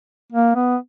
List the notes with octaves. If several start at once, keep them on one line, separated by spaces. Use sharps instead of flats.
A#3
B3